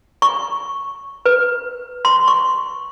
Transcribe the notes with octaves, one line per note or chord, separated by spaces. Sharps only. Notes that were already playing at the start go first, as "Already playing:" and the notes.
C#6
B4
C6
C#6